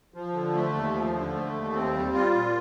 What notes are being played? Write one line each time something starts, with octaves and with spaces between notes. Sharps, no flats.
F3
D3
A3
D#2
F3
D3
A3
D#2
C4
G3
F4
A#2